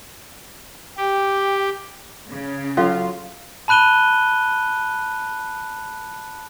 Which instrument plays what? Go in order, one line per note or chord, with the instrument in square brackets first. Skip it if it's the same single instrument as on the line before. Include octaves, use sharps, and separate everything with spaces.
[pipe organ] G4 [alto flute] G5
[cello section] C#3
[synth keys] F#3 F4 [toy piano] C#4 A4 F5
[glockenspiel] A5 B5 F#6 D#7 G7